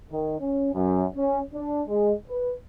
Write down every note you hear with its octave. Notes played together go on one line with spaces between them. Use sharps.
D#3
C#4
F#2
C#4
D4
G#3
B4